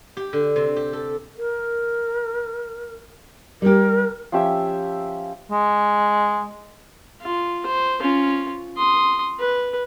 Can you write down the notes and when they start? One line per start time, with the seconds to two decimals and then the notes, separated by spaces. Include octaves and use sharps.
0.17 G4
0.33 D3
0.56 C3
0.76 G4
0.93 A4
1.38 A#4
3.62 G3 G4 A#4
4.32 F3 C#4 G4 E5
5.51 G#3
7.22 F4
7.66 C5
8.01 C#4 F4
8.77 C6 D#6
9.39 B4